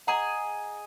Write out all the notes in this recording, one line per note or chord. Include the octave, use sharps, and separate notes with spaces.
G#4 D#5 F#5 G#5 A#5